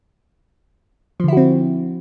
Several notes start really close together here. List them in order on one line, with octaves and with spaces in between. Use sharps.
F3 D3 E4 F#4 C4